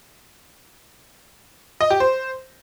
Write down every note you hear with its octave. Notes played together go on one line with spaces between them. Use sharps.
D#5
G4
C5